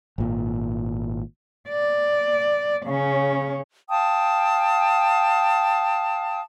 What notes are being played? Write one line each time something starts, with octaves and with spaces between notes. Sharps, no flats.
G#1 A#2
D5
C#3 C#4
F5 G5 A5 D#6